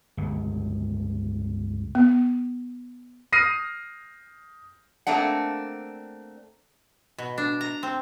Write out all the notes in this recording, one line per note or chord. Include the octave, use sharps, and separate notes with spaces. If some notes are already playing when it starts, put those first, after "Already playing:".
G1 C#2
B3
D#6 F6 A#6 C7 D#7
A3 A#3 C4 D4 F#5
B2
D4
A#5
C4